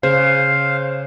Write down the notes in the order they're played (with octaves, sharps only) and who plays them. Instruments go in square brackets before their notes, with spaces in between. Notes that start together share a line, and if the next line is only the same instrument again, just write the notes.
[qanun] C#3 [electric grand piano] C5 [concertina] F5